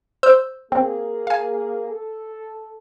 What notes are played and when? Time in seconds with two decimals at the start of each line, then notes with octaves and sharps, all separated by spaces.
0.23 C5 E6 G6
0.72 A#3 C4 G#4
1.27 F5 G#5
1.89 A4